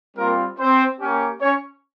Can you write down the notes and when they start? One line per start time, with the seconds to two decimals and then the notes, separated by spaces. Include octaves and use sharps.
0.17 G3 A#3 C4 F4 A#4
0.59 C4 C5
1.00 A#3 C#4 G4
1.41 C#4 C#5